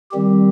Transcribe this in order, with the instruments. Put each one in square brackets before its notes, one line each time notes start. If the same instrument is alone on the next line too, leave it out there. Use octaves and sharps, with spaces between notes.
[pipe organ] D#3 G3 C4 G4